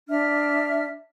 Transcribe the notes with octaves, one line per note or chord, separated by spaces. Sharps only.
D4 E5 F6